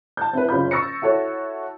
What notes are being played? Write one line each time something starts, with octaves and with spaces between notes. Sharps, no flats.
A5 G6
C4 E4 B4
F#1 C#3 F4 B5 G6
C#6 E6 A6 A#6 C#7
E4 F#4 A4 C#5